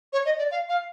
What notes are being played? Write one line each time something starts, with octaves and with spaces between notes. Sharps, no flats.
C#5
D#5
D5
F5
F5